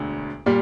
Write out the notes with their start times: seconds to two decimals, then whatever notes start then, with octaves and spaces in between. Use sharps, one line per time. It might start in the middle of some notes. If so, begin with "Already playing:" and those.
Already playing: E1 D2 D3
0.46 A#2 G3